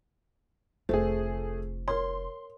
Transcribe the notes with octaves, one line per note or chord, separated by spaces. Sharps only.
F1 A3 F4 G#4 C5
A#4 C#5 C6